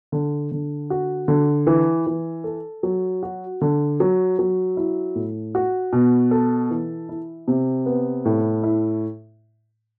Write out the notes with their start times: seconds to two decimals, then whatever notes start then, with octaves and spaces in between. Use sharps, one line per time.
0.12 D3
0.51 D3
0.90 F#4
1.28 D3
1.67 E3
2.07 E3
2.44 A4
2.83 F#3
3.23 F#4
3.61 D3
4.00 F#3
4.39 F#3
4.77 E4
5.15 A2
5.55 F#4
5.93 B2
6.31 A4
6.70 E3
7.09 E4
7.48 C3
7.86 B3
8.25 A2
8.63 E4